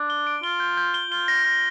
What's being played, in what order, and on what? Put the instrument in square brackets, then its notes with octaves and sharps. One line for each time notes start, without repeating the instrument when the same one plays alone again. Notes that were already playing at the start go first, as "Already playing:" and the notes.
Already playing: [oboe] D4
[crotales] G7
D7
[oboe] F4 [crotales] G7
[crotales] G6
G6
G7
[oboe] F4 [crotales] G7
[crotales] A#6
[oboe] F4 [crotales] A#6